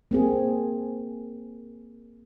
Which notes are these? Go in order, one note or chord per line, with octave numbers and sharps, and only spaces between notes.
A#3 C4 G#4